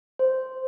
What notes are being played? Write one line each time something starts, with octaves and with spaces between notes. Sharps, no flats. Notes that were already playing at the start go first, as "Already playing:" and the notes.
C5